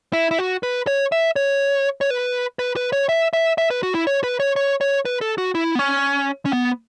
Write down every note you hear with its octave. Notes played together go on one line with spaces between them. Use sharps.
E4
E4
F#4
B4
C#5
E5
C#5
C#5
B4
B4
B4
C#5
E5
E5
E5
B4
F#4
E4
C#5
B4
C#5
C#5
C#5
B4
A4
F#4
E4
B3
C#4
C#4
B3